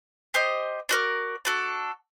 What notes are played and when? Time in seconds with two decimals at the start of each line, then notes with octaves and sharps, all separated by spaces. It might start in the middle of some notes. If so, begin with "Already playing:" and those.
0.34 G4 C5 D#5
0.89 D4 F#4 A#4 D5
1.45 D4 F#4 A4